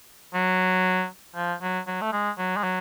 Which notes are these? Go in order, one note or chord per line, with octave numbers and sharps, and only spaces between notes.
F#3
F3
F#3
F#3
A3
G#3
F#3
G#3
F#3